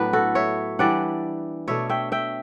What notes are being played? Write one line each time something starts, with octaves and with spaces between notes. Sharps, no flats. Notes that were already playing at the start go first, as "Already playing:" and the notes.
Already playing: A2 F#3 B3 D4 B4 D5
F#4 A4
C#5 E5
E3 G3 D4 D5 F#5
B2 A3 D4 C#5 E5
E5 G5
E5 G5